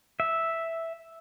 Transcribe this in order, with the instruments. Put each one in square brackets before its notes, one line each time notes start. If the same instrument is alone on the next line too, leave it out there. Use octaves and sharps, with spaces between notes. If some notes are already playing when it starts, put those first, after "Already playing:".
[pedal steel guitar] E5